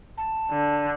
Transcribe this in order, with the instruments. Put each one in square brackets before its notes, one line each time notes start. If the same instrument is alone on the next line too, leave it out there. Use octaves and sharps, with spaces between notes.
[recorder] A5
[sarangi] D3